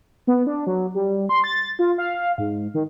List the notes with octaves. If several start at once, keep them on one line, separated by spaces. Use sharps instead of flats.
B3
D4
F#3
G3
C6
A6
F4
F5
G#2
D#3